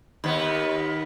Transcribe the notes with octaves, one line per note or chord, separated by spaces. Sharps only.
D#2 B3